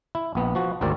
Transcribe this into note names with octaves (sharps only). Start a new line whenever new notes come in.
E4
A#1 B3
F3 F#4
G#1 D2 G#2 C4 A#4 D5